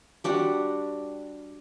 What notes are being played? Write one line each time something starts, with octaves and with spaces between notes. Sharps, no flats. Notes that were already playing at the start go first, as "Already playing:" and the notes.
G3 D4 F#4 F#5